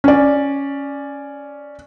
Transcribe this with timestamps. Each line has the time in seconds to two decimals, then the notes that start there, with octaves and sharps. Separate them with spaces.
0.04 C#4 D5